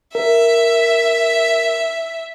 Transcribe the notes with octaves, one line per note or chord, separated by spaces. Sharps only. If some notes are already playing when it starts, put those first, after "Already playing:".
A#4 E5